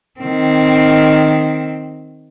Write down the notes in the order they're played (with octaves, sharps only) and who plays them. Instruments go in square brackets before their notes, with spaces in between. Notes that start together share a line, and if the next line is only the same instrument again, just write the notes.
[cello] D#3 C4